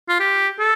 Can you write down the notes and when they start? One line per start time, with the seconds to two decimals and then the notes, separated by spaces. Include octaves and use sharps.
0.09 F4
0.19 G4
0.59 A4